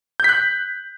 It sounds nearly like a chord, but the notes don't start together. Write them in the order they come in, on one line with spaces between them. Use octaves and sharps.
G6 B6 F#6